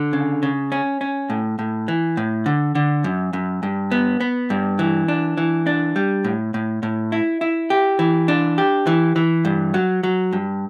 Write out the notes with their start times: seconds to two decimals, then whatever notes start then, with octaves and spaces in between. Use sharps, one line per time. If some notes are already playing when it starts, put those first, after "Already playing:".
Already playing: D3
0.13 C#3
0.43 C#3
0.72 C#4
1.01 C#4
1.30 A2
1.59 A2
1.88 E3
2.17 A2
2.46 D3
2.75 D3
3.04 F#2
3.33 F#2
3.63 G2
3.91 B3
4.20 B3
4.50 G2
4.79 E3
5.08 D4
5.37 E3
5.67 D4
5.96 G3
6.24 A2
6.54 A2
6.83 A2
7.12 E4
7.41 E4
7.70 G4
7.99 E3
8.28 D4
8.58 G4
8.87 E3
9.16 E3
9.45 G2
9.74 F#3
10.03 F#3
10.33 G2